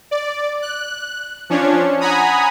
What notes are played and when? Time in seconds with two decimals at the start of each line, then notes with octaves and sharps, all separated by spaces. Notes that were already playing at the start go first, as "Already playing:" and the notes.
0.11 D5
0.62 F#6
1.50 F3 C#4 D4 C#5
2.01 F#5 G#5 A#5 B5 D#6